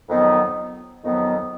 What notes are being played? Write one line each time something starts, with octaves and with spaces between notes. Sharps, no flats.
F2 D#3 F#3 B3
F2 D#3 F#3 B3